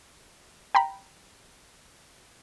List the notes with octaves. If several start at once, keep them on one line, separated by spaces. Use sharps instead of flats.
G5 A#5 B5